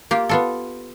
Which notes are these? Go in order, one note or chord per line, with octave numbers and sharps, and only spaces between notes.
A#3 F4 G4
B3 F4 A4